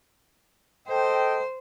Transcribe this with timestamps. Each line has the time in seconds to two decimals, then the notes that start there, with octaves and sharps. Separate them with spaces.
0.88 A4 C5 D#5 G5